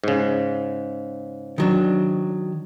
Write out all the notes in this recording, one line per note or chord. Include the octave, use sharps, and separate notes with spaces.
G#2 C#3
D#3 F#3 D4